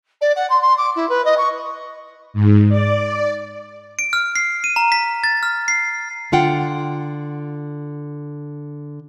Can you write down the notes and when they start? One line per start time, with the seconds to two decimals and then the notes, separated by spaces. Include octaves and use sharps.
0.21 D5
0.36 F#5
0.50 C6
0.61 C6
0.77 D6
0.95 E4
1.09 B4
1.24 D#5
1.37 C#6
2.34 G#2
2.69 D5
3.99 D7
4.13 F6
4.36 C7
4.64 D#7
4.76 A#5
4.92 B6
5.24 A6
5.43 F6
5.68 C7
6.32 D3 F4 F#5 G5